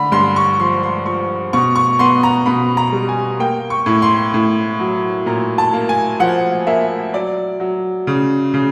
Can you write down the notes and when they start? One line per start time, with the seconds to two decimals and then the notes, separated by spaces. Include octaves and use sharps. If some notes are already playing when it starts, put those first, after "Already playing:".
Already playing: D3 B5
0.12 G2 C6
0.36 C#6
0.59 F3 C6
0.83 C6
1.06 F3 C#6
1.53 B2 C#6
1.75 C#6
1.99 B3 C6
2.23 A#5
2.46 B2 B5
2.77 A#5
2.92 G3
3.09 G#5
3.39 A#3 G5
3.70 C#6
3.86 A2
4.02 C6
4.34 A2
4.80 F#3
5.26 A#2 A#5
5.58 A5
5.73 A#3
5.89 G#5
6.20 F3 F#5
6.67 A#3 E5
7.13 F#3 D5
7.60 F#3
8.07 C#3
8.54 C#3